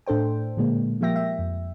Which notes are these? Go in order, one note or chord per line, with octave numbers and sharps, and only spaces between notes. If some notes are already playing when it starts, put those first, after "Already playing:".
A2 D4 A4 C5 G5
A#2 D3 G#3 A#3
F3 G3 A#3 E5 G5 A#6
E5
F2